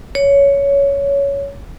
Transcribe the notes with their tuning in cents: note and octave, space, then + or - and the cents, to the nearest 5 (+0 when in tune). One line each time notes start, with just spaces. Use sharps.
C#5 +15